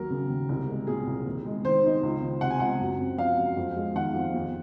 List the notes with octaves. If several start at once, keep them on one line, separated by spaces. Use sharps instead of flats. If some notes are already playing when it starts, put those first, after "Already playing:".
Already playing: D#2 F#3 A#4
C#3
D#2
C2
G#3
A#2 G#4
C2
D#2
G#3
D#3 C5
D#4
C#2
D#3
C3 F#5
G#5
C#2 F#5
F#2
C4
F3 F5
F#2
F2
G#3
D#3 F#5
F2
D#2